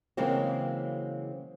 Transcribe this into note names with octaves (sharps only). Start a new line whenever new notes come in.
C#3 E3 F#3 G#3 A#3 C4